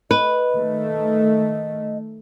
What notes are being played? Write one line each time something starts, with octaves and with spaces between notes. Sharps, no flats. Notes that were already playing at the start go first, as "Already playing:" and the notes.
B4 D#5
D#3 A3